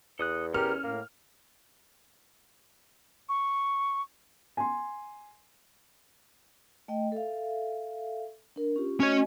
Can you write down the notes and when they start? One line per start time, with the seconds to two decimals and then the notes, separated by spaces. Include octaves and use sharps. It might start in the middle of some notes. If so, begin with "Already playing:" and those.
0.19 E2 A4 D#6 F#6
0.54 C#4 G4 A4 A#4 F6
0.84 A2 A#3
3.29 C#6
4.57 G#5 C6
6.88 A3 D#5 G5
7.12 A4 E5 F5
8.56 D4 A#4
8.76 C#4 F4 G4
9.00 A3 C#4 F#4 C#5 D#5